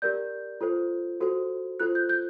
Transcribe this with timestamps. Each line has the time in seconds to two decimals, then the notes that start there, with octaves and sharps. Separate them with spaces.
0.02 G4 A#4 D5 G6
0.61 F4 A4 C5
1.20 F#4 A4 C5
1.80 F4 A4 C5 F#6
1.95 G6
2.09 G6